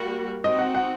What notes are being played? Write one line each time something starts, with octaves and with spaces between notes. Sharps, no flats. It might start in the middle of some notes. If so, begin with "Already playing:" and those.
Already playing: G3 A#3 F#4
C4 D#4 F#4 D#5
F#5
F#5